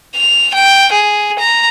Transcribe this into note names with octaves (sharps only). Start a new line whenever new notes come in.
F7
G5
G#4
A#5